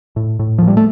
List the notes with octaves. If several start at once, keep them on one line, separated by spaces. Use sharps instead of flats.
A2
A2
A2 F3
G3
A3